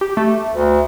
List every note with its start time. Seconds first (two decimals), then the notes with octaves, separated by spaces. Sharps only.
0.01 G4
0.17 A3
0.54 D2